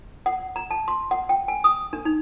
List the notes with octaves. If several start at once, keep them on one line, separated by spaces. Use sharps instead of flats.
F#5
A#5
A5
C6
F#5
G5
G#5
D#6
D4
D#4